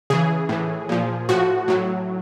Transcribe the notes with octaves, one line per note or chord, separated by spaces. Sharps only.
C#3 E3 G#4
A2 E3
A#2 F3
A2 F3 F#4
A2 F#3